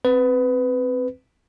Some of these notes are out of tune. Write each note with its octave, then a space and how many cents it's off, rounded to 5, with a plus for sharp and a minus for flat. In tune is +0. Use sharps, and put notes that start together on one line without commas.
C4 +0 B4 +15